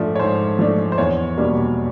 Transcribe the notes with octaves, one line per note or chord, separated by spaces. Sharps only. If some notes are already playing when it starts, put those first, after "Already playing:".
Already playing: G#2 F3 A3 D4 D5
C#5
G#2 C5
F3 A3 D4
C5
E2 C#5
B2 G3 A#3 D4